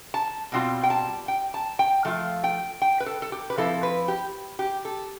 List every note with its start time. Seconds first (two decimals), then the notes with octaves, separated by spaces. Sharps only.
0.14 A5
0.52 B2 G3 C4 F4
0.83 G5
0.90 A5
1.28 G5
1.54 A5
1.79 G5
2.05 F3 A3 F4
2.44 G5
2.82 G5
3.00 B4
3.06 A4
3.22 A4
3.32 G4
3.50 B4
3.58 F3 C4 E4 A4
3.83 B4
4.08 G4
4.59 G4
4.85 A4